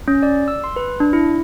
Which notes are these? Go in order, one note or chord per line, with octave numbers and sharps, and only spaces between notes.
C#4
D5
E6
C6
B4
D4
E4